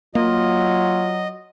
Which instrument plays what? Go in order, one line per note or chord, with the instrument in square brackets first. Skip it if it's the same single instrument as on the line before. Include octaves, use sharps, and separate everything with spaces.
[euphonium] F#3 [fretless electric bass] A#3 [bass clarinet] F4 [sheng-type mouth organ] D#5